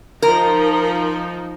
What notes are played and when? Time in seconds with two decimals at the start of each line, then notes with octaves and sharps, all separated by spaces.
0.22 F3 D#4 A#4